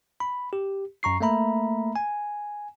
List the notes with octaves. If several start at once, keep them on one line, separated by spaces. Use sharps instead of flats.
B5
G4
F#2 A#5 C#6 C7
A3 A#3 E5 A#5 B5
G#5